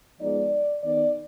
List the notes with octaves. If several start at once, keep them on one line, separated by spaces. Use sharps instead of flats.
F3 G#3 B3 D#4 D5
D#3 B3 D#4 D5